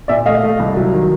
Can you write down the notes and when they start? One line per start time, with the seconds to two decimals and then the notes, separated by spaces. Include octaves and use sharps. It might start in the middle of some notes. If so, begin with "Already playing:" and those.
0.08 A#2 D5 E5
0.26 A3 D#5 F5
0.43 A3
0.60 C2
0.76 F#3
0.94 D#3